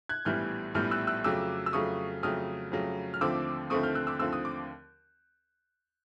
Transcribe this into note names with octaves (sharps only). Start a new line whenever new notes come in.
F#6 G#6
A#1 A2 E3 G3 B3 F6 G6
A#1 A2 E3 G3 B3 F6 G6
E6 F#6
E6 F#6
F2 C#3 F#3 A3 D6 E6
E6
F2 C#3 F#3 A3 C#6 D#6
F2 C#3 F#3 A3 D#6 F6
F2 C#3 F#3 A3
F6
D#2 D3 F3 A3 C4 D6 E6
D#2 D3 F3 A3 C4 C#6 D#6
F6 G6
E6 F#6
D6 E6
D#2 D3 F3 A3 C4 E6
D#6
D6